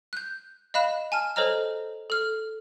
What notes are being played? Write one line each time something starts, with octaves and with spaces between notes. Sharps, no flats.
F#6 G6
D#5 F5 B5 F#6 E7
G#5 A5 F6
A4 C5 C#5 D#5 A#5 F6
A4 F6